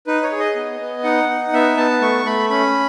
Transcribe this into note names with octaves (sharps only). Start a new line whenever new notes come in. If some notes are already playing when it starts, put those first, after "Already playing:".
D#4 B4
C#5
G#4
D#5
B3
B3
D#4 F#5
D#4
B3 E5
B3 A5
A3 C#6
A3 B5
C#4 B5